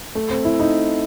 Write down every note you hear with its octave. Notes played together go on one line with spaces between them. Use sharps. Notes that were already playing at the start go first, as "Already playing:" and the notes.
A3
C4
E4
D#4